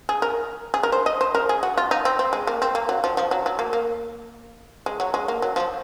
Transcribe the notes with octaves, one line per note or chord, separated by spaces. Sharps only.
G#4
A#4
G#4
A#4
C5
D#5
C5
A#4
G#4
F#4
F4
D#4
C4
C4
G#3
A#3
C4
A#3
F#3
F3
F3
F#3
F#3
A#3
A#3
G#3
F#3
G#3
A#3
F#3
F3